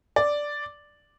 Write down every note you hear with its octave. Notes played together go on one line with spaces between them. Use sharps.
D5